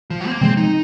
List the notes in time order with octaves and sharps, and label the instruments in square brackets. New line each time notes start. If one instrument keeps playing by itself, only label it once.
[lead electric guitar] F3
F#3
C4
A#3
[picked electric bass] C3 F3 G#3 [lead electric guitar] C4
[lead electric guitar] D#4